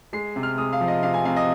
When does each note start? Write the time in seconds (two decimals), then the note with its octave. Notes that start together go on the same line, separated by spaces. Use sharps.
0.13 G#3 C7
0.36 C3
0.43 F6
0.58 G#3 D#6
0.73 F5
0.80 F3
0.88 D#5
1.03 C3 F5
1.14 G#5
1.25 C3 F5
1.36 D#5